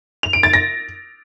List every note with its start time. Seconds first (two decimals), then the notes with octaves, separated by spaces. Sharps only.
0.23 F7
0.33 D7
0.43 A6
0.53 A#6